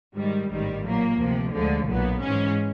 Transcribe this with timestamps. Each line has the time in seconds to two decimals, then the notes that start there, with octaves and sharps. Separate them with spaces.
0.16 G#2 D#3 G3
0.50 A1 G#2 D#3 G3
0.84 A#2 F#3 A#3
1.19 D2 C3 F3
1.53 D2 D3 F3 G#3
1.88 B1 A#2 F#3 B3
2.21 G#2 E3 G#3 C#4